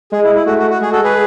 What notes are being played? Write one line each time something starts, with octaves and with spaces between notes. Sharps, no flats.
G#3 G#4
E4
E4
A3 F#4
F#4
F#4
G#3 G#4
F#4 A4
G#4 B4